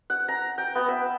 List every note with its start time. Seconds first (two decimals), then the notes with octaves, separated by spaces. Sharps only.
0.10 F#5
0.28 A#5
0.58 G5
0.75 B3
0.88 E5